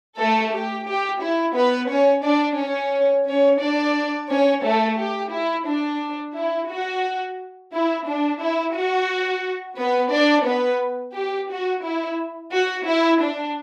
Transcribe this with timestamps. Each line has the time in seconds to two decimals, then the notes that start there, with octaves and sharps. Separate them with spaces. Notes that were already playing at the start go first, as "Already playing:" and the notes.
0.18 A3 A4
0.52 G4
0.87 G4
1.21 E4
1.55 B3 B4
1.89 C#4 C#5
2.24 D4 D5
2.58 C#4 C#5
3.27 C#4 C#5
3.61 D4 D5
4.29 C#4 C#5
4.64 A3 A4
4.99 G4
5.32 E4
5.66 D4
6.35 E4
6.70 F#4
7.73 E4
8.07 D4
8.41 E4
8.75 F#4
9.79 B3 B4
10.12 D4 D5
10.47 B3 B4
11.15 G4
11.50 F#4
11.84 E4
12.52 F#4
12.87 E4
13.21 D4